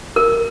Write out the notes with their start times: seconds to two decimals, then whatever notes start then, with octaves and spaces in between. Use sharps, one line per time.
0.16 A#4